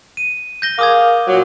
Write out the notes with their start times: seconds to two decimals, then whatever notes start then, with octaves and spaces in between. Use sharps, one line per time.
0.17 D#7
0.62 G6 A#6 G7
0.79 G#4 A#4 F5 D6 D#6 G#6
1.28 A#2 F#3